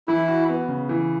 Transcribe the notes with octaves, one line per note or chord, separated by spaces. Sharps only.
E3 E4
F#4
B3
C#3
E3